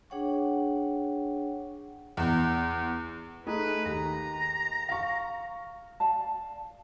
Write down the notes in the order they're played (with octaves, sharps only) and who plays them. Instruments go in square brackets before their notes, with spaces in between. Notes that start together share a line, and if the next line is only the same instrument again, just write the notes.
[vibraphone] D4 G#4 C#5 F#5 G5 C#6
[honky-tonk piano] E2
[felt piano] A3 D#4 G#4 [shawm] B4
[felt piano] D#2 [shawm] A#5
[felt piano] F5 C#6
[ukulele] D5 F5 A5